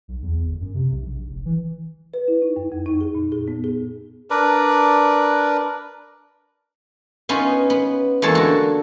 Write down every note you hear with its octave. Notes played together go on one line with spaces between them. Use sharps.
B1
E2
G1
F#2
C3
B1
A#1
F1
E3
B4
E4
D#4
F#2
F2
D#4
G#4
A#2
G#4
B3
G#4
D4 A#4 B4 D5
B3 C#4 D#4 F4
B3
E2 G#3 A#3 A4 C#5 A5
D3 F#4